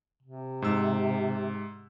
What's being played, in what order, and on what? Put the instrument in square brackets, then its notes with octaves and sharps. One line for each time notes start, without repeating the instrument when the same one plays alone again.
[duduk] C3
[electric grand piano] G#2 E6